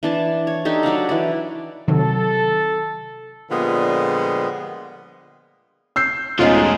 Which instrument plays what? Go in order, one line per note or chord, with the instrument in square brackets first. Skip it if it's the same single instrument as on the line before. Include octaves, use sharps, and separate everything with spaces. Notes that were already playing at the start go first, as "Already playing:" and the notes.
[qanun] E3 D4 A5
C#5
D4 D#4 G4 A4
F#3 D4 F5 F#5
E3 D5
[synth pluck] C3 D#3 F#3 [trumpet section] A4
[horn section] A#2 D3 F3 G3 G#3 B3
[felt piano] E6 G6 C7
[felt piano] E1 C#4 D#5 [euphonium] G#2 [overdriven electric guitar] G#3 A3 [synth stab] F4